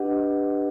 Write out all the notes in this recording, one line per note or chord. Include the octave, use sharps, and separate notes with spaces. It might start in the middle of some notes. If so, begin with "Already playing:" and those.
Already playing: D4 G4 B4 D#5 F#5